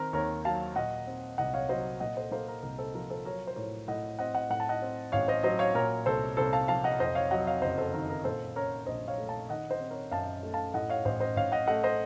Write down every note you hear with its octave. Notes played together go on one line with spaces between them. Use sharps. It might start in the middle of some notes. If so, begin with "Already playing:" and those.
Already playing: D#3 C4 A#4
D#2 A#4 C#5
F#3 F5 A5
A#2 D#5 F#5
C4
C2 D#5 F#5
C#5 F5
F#3 C5 D#5
A#2 D#5 F#5
A4 C5
A#3 A4 C5
A#4
C2 A#4
A4 C5
F3 A#4
A4 C5
F#3 A#4 C#5
C5
A2 A#4 C#5
A2 D#5 F#5
C4 D#5 F#5
D#5 F#5
A2 F#5
A5
D#5 F#5
C4
A1 C#5 F5
C5 D#5
F#3 C5 D#5
C#5 F5
A#2 A#4 C#5
C2 A4 C5
C2 A4 C5
F5 A5
F3 F5 A5
D#5 F#5
F2 C5 D#5
C#5 F5
F#3 D#5 F#5
C#5 F5
F#1 C5 D#5
A4 C5
D#3 A#4
A#4
A#2 A4 C5
C#4 A#4 C#5
A#1 C5 D#5
C#5 F5
A3
F5 A5
D#3 D#5 F#5
C5 D#5
C4
A#4 C#5
F#2 F5 A5
A3
F5 A5
A2 D#5 F#5
C#5 F5
A1 C5 D#5
C5 D#5
A1 C#5 F5
D#5 F#5
A3 D#5 F#5
C5 D#5